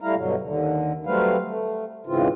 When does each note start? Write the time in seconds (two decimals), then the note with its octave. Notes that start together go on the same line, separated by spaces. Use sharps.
0.01 G3 A3 E4 F5 A#5
0.15 G2 B2 D3 F#3
0.40 D#2 D3
1.06 F#3 G3 A3 C4 B4 F5
1.46 A3
2.07 G#2 C#3 E3 C4 F4